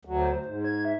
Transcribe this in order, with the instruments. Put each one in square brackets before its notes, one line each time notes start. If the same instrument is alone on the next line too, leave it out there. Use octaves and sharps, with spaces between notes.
[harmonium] D2 F#3
[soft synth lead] C5
[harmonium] G#2
[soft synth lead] G#6
E5